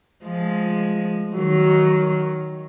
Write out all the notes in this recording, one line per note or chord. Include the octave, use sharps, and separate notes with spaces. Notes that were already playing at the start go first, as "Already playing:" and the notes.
F3 G#3
D#3 F#3